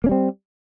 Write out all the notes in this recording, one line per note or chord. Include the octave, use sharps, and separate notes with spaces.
G3 A#3 C4 C#4